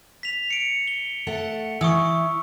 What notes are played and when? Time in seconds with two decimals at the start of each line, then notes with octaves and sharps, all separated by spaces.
0.23 B6 F7
0.50 C#7 D7
0.88 G7
1.27 A3 A4 F#5
1.81 E3 C#6 D#6 E6